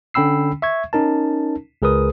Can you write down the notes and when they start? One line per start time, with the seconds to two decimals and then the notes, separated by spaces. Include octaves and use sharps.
0.14 D3 C#4 G5 B5 E6 C7
0.62 E5 C#6 G#6
0.93 C#4 D#4 A#4 A5
1.82 C#2 G#4 A#4 B4 D#6